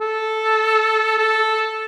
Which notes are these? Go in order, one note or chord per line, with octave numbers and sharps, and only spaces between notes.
A4
A4